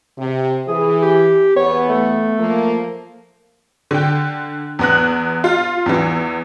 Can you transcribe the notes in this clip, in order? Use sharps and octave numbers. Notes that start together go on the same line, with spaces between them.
C3
E3 G#4
G4
E2 B3 C#5
A3
F3 A#3
D3 G5
E2 B3 F#6
F4
E2 E3